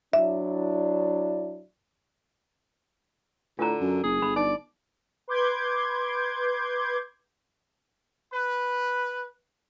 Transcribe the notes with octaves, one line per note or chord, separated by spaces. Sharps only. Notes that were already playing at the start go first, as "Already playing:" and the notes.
F#3 D4 E4 E5
A2 D3 F4 A#5
F#2
F#1 G#4
G1 B5
D#4 D5
B4 C6 D6 G6 G#6
B4